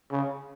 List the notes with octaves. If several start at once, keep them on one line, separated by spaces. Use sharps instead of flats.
C#3